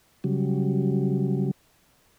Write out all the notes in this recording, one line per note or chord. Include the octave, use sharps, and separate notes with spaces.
C#3 F#3 G3